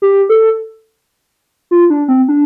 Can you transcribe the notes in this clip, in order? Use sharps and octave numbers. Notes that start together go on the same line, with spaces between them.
G4
A4
F4
D4
C4
D4